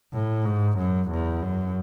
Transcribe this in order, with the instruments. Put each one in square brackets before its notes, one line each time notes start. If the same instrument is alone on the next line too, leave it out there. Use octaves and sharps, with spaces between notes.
[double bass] A2
G#2
F#2
E2
F#2